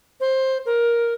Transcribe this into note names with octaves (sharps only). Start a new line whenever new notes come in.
C5
A#4